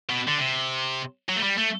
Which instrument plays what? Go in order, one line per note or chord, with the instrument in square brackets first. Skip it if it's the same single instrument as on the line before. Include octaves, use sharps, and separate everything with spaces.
[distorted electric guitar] B2
D3
C3
F#3
A3
G3
A3